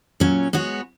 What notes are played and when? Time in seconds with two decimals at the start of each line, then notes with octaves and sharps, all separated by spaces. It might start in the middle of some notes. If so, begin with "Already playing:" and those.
0.20 A#2 F#3 C#4
0.53 G#3 B3 F#4 C#5